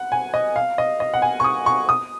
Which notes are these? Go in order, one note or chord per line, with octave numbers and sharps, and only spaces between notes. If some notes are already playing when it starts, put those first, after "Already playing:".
Already playing: F#5
G#5
D#5
F5
D#5
D#5
F#5
G#5
C#6
D#6
C#6
D#6